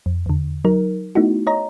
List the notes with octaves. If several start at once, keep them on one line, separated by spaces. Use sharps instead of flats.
F2
E2 D3
F#3 D#4 A#4
A3 B3 D#4 E4 F#4
C#5 D#5 A#5